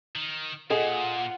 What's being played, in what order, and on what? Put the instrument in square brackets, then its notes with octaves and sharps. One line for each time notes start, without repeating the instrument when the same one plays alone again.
[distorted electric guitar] D#3
[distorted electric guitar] A#2 [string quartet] F4 F#5 [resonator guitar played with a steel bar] G#4 D#5 G#5 [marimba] A4